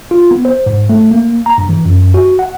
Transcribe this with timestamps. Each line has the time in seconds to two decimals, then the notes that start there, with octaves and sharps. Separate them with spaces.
0.11 F4
0.31 B3
0.45 C5
0.66 G#2
0.89 A3
1.11 A#3
1.46 A#5
1.58 G2
1.69 E3
1.85 F#2
2.14 F#4
2.39 F#5